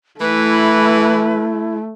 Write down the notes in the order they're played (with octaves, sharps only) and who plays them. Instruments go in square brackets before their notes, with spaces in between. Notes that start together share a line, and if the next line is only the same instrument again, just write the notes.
[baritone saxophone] E3 [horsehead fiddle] A3 [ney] E4 [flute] B4